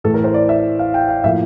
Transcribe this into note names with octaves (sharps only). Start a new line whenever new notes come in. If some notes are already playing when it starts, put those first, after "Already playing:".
A2 E3 A3 A4
A#4
C5
D5
E5
F5
G5
F5
A2 F3 A#3 E5